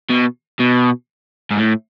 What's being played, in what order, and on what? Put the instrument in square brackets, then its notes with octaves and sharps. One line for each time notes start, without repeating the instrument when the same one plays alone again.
[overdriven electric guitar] B2
B2
G#2
A2